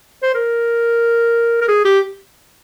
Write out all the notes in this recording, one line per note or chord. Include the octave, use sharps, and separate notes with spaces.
C5
A#4
A#4
G#4
G4